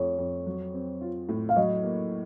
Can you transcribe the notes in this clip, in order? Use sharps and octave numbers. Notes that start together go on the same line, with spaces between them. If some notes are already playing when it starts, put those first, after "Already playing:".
Already playing: F2 A3 C#5
F2
F#3
C4
F4
A2
F5
F#3 D#5
A#3